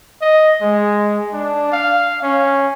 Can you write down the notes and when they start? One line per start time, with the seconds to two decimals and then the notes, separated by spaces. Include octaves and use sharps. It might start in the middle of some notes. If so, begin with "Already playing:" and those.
0.21 D#5
0.62 G#3
1.33 D4
1.72 F5
2.22 C#4